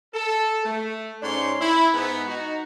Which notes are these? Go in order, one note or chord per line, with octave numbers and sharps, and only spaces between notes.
A4
A3
G#2 C#4 D4 C#5 C6
E4
G#2 B3
D#4 F#4